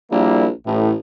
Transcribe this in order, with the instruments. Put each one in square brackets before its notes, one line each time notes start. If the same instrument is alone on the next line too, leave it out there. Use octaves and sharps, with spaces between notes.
[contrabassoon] A#1 [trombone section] G3 A#3 E4
[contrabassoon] A1 [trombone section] A2